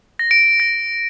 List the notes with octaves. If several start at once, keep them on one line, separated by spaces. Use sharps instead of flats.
A#6
D7
A#6